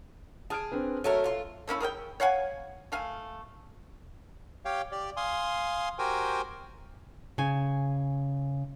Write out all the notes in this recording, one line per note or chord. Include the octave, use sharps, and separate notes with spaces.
G#4 A5 F6 D7
C4 D4 B4
F#3 A3 A4 A#4
F4
A3 A#3 C#4 E4
G#4 A#4 D5 G5
C#5 F5 F#5 G#5
A3 F5 G#5
G4 C#5 F5 G5
G4 D5
F5 G#5 C6 D#6
F#4 G4 A#4 C5 G5 G#5
C#3 G#5